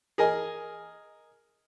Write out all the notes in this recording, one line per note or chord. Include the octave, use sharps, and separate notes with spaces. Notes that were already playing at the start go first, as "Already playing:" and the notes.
G#4 A#4 D#5 G#5